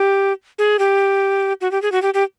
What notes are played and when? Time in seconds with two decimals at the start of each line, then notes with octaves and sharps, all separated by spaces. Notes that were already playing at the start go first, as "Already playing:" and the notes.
Already playing: G4
0.58 G#4
0.79 G4
1.61 F#4
1.71 G4
1.82 G#4
1.92 F#4
2.02 G4
2.14 G4